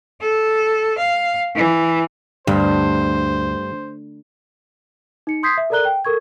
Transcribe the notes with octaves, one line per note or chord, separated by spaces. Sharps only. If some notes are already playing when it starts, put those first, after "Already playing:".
A4
F5
E3
D2 G2 C5
D#4 C#7
C6 D#6 G6 G#6 B6 C7
E5
A4 A#4 D5 A#5 F#6 G7
G5
A4 A#4 C#6 G#6